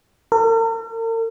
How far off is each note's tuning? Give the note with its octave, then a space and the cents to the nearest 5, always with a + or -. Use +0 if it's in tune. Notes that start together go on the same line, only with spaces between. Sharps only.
A#4 -45